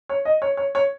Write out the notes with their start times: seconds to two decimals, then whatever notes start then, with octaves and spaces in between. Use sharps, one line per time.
0.09 C#5
0.25 D#5
0.42 C#5
0.57 C#5
0.75 C#5